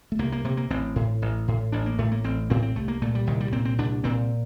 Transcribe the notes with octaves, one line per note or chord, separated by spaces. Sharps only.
A3
C2 A#3
A#3
C3 A#3
A#3
A1 C4
A2
A1
A2
A1 D4
A#3
A2 A3
A#3
A1 C4
A2 C4
C4
C2 A3
A#3
A#2 A3
G3
C2 D#3
G3
A#2 C4
C4
C2 D4
A#2 C4